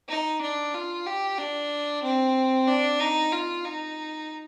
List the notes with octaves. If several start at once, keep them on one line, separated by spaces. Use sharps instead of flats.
D#4
D4
F4
G4
D4
C4
D4
D#4
F4
D#4